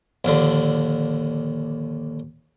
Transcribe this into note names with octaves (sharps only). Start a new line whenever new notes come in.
A#1 D#2 D3